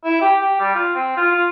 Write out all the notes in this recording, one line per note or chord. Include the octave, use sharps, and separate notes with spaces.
E4
G4
G4
G3
F4
C4
F4
F4